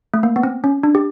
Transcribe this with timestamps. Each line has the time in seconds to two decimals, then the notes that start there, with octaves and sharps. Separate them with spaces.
0.14 A3
0.23 A#3
0.36 B3
0.43 C4
0.64 C#4
0.83 D4
0.95 G4